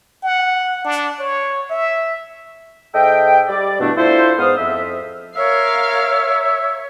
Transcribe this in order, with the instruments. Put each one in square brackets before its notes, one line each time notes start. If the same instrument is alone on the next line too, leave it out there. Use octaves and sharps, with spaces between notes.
[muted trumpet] F#5
D4
C#5
E5
[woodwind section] G#2 A4 D#5 E5 G5
G3 D5
G2 B2 E3 A3 D4
D4 E4 F4 A4 C5
G#2 B3 C5 F5 D#6
F2 E5
[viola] A#4 F5 [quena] C#5 [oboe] E5